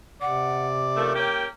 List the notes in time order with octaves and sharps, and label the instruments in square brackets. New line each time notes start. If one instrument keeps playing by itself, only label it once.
[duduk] C3 [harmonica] D5 [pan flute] F#5
[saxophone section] C#3 F3 A3 [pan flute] A#4
[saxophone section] A#3 C#4 G4 [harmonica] G5